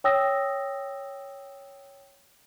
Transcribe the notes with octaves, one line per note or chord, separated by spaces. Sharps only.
C#5 G5 D#6 E6 A#6